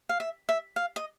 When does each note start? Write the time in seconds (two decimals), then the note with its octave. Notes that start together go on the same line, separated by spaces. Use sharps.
0.09 F5
0.20 E5
0.49 E5
0.76 F5
0.96 D#5